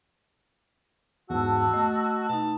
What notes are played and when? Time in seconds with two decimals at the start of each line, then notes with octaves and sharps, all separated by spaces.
1.30 E2 G#2 F#4 A5 E6
1.74 A3 D#5
2.29 B2 D#4 A5